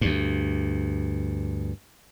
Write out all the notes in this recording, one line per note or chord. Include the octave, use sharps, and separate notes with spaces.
D2 G2